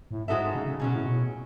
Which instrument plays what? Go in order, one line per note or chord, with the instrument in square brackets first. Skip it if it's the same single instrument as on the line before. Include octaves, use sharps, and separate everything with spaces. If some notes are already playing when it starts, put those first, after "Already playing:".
[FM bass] A2
[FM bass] G#2 [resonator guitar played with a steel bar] G#3 D#4 F#4 A4 E5
[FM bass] C#3
C#3
[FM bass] B2 [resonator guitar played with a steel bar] F#3 C#4 G#4
[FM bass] A2
B2